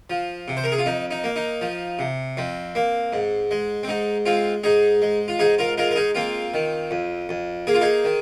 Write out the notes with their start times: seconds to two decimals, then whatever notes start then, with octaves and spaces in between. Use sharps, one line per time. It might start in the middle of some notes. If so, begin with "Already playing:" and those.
0.10 F3
0.48 C3
0.57 C5
0.64 A#4
0.72 G#4
0.78 F4
0.86 F2 D#4
1.11 D#4
1.24 A#3
1.36 D#4
1.61 F3
1.99 C3
2.37 F2 C4
2.75 A#3
3.13 G#2
3.51 G#3
3.83 C4
3.88 G#2 D#4
4.26 G#3 C4 F4
4.64 G#2 D#4 G#4
5.02 G#3
5.28 F4
5.39 G#2 D#4 G#4
5.58 F4 A#4
5.78 G#3 F4 A#4
5.91 A#4
5.96 D#4 G#4
6.15 A#3 C4 F4
6.54 D#3
6.91 F2
7.29 F2
7.67 A#3 G#4
7.74 F4
7.81 D#4 G#4
8.04 D#3